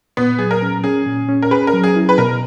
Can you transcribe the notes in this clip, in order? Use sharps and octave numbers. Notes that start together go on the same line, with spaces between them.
A#2 B3
F#3 G#4
A#4
C#4
C#4 G#4
A#2
C#4
A#4
G#4 B4
A#4
F#3
G#4
E4
B4
B2 A#4